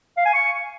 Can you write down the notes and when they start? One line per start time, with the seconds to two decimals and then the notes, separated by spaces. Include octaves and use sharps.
0.17 F5
0.25 G#5
0.34 C#6